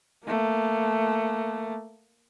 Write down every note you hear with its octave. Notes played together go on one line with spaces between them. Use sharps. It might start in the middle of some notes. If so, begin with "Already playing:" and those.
A3 A#3